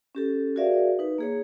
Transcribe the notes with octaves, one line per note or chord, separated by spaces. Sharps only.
C#4 G4 A4
F#4 G#4 A#4 D5 E5 F5
D#4 B4
A#3 G#4 C#5